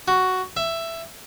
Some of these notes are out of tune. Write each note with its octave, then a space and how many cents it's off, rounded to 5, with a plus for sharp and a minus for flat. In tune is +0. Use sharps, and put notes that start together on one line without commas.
F#4 +5
E5 +10